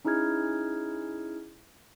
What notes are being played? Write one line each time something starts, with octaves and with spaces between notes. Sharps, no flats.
C#4 D#4 E4 G#4 F6 G#6